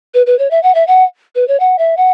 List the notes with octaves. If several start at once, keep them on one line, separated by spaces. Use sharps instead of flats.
B4
B4
C#5
E5
F#5
E5
F#5
B4
C#5
F#5
E5
F#5